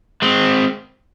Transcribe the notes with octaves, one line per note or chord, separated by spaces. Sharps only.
G#3 C4